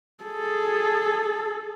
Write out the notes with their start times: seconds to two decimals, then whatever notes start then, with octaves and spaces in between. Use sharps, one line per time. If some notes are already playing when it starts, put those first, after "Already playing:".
0.24 G#4 A4